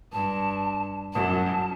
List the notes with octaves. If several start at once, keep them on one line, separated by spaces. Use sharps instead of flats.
G2 A5
F#2 A5